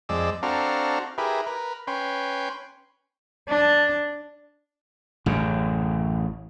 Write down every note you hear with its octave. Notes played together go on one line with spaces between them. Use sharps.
F2 G#3 D5 E6
C4 D4 F#4 A4 F5 A#5
E4 G4 G#4 A#4 B4
A#4 B4
C#4 B4 G5 C6
D4
A1 F#2 C#3